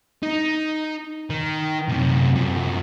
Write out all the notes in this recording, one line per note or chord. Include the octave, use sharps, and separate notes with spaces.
D#4
D#3
F#2 C3
F#2 F3